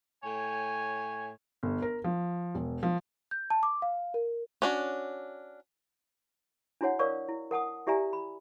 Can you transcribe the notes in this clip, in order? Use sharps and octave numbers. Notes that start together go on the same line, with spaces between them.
A2 C#5 G5 G#5
G1
A#4
F3
E1
F3
G6
A5
D6
F5
A#4
C#4 D4 F#4
D4 E4 F#4 C#5 F#5
A#4 C#5 D5 F5 C#6 E6
E4
A#4 F#5 A5 D#6
E4 G4 D5 E5 G#5 A#5
B5